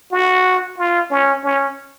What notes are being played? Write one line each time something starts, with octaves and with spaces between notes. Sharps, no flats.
F#4
F4
C#4
C#4